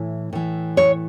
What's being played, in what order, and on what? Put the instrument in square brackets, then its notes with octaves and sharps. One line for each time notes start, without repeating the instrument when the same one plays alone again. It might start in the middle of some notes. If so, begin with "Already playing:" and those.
Already playing: [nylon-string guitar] A2 E3
A2 E3
C#5